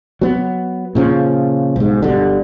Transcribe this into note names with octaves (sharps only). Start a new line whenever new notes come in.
F#3 B3
A#2 C#3 F3
B1 G#2
G1 G2 B2 D3